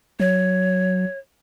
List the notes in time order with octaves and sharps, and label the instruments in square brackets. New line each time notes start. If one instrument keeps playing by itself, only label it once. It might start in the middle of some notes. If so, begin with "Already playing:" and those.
[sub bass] F#3 [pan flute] C#5